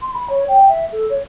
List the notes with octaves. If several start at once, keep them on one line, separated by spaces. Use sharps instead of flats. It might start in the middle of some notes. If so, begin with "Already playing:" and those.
C6
B5
C#5
G5
E5
A4
C#5